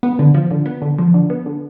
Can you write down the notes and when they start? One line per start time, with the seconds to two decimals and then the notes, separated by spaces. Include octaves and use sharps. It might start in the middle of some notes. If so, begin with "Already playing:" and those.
0.03 B3
0.19 D3
0.34 F3
0.51 D3
0.66 B3
0.82 D3
0.99 F3
1.14 D3
1.30 B3
1.46 D3